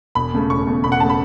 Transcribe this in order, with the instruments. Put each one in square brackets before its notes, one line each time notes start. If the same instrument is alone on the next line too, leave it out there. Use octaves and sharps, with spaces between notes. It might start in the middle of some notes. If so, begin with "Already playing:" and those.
[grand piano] E1 [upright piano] B5
[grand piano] E2 C#3 A3
[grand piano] E1 [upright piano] C#6
[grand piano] E2 C#3 A3
[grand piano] E1 [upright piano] B5
[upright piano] F#5
[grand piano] C#3 A3 [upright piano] A5
[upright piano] B5